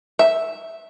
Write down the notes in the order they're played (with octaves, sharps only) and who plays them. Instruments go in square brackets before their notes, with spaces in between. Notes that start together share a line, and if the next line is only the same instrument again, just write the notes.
[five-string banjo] E5